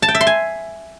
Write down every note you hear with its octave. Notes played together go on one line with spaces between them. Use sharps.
A5
G5
E5
C6
G#5